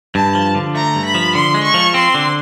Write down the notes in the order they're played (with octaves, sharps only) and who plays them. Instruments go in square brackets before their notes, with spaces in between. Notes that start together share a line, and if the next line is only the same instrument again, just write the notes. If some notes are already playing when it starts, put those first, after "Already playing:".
[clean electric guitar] G2 [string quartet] A5
[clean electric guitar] F3
D3
[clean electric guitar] A3 [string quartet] A#5
[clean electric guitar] G2
[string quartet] B5
[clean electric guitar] F3
[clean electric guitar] D3 [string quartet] C6
[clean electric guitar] G#3
[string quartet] C#6
[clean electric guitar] F3
[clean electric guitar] C4 [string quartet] C6
[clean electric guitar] D3